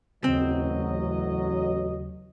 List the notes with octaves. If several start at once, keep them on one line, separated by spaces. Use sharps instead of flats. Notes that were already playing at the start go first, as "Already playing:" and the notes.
A1 D#2 C#3 F#3 C4 D#5